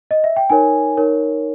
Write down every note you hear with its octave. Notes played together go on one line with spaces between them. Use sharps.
D#5
E5
G5
D#4 A#4 C#5 G#5
D#4 A#4 C#5